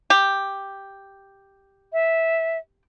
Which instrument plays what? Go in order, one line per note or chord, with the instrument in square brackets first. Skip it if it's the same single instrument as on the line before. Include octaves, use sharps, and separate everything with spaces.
[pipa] G4
[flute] E5